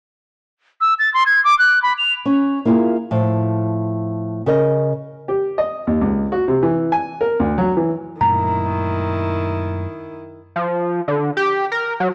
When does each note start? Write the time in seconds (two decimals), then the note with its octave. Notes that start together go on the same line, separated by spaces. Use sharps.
0.81 E6
0.99 A6
1.14 C6
1.26 G#6
1.44 D6
1.59 F#6
1.83 B5
1.98 F7
2.26 C#4
2.65 A#3 E4 F4 G#4
3.11 A2 F3
4.46 C#3 A#4 D#5
5.28 G4
5.58 D#5
5.87 D#2
6.01 C#2
6.32 F#4
6.48 C3
6.63 E3
6.92 G#5
7.21 A#4
7.40 D2
7.58 F#3
7.77 E3
8.21 F#2 A#2 D#3 A3 E4 A#5
10.56 F3
11.08 D3
11.37 G4
11.72 A#4
12.00 F#3